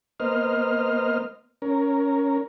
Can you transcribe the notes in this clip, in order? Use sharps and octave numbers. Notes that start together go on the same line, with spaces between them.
A#3 B3 C5 D#5 F6
C#4 A#4